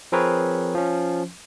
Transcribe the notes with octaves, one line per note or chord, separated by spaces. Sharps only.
F3 C4 G#4 A#4 B4 C#5
F3 C#4